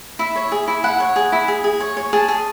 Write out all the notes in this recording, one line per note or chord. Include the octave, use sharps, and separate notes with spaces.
E4 E5
C#5
G#4
E4
E4 F#5
C#5
G#4
E4
G#4
G#4
C#5
C#5
G#4 A5
G#4